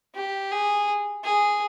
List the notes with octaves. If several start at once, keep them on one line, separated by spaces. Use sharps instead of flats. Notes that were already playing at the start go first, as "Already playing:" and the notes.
G4
G#4
G#4